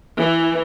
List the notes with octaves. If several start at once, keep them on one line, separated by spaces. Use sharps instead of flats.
E3